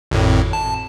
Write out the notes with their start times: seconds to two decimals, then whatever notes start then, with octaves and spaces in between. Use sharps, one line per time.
0.11 G#1 F2 A2
0.53 A5